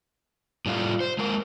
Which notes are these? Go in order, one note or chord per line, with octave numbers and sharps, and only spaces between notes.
A2 G3 A3 F4
C5
G#3 A#3 A#4